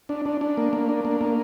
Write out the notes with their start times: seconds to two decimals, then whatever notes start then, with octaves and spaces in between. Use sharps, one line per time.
0.09 D4
0.25 D4
0.41 D4
0.57 A#3
0.73 A#3
0.89 D4
1.05 A#3
1.21 A#3